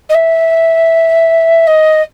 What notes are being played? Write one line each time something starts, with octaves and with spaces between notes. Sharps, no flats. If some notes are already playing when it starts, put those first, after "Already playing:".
D#5
E5
D#5